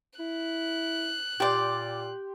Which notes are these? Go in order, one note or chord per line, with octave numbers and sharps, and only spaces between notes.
E4 F#6
A#2 G4 D5 G5 C6